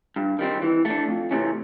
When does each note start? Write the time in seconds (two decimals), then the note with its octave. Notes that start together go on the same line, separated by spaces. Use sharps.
0.16 G2
0.39 D#3 G3 C4
0.62 E3
0.85 A3 D4
1.08 F2
1.31 C3 E3 A3 C#4